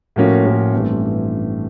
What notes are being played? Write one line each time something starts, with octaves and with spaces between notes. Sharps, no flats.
A2 F3 A#3 C#4 F#4
A2 F3 A#3 C#4 F#4
A1 G2 E3 A3 C4